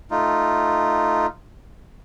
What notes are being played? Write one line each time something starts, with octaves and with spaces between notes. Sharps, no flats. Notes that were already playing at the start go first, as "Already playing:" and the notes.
A3 D#4 F4